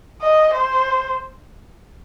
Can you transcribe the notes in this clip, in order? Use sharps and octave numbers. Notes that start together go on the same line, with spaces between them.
D#5
C5